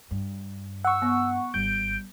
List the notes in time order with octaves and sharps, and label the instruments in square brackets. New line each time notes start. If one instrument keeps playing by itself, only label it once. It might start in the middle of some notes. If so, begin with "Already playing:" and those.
[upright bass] G2
[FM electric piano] F#5 C#6 [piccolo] E6
[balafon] B3
[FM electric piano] G#1 G6 [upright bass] G3 [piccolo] D7